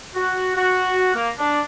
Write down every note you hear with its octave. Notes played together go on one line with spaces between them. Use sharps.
F#4
F#4
A#3
D4